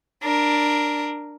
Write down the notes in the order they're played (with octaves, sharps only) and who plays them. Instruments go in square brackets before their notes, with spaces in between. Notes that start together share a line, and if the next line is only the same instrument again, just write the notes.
[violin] D4 A#4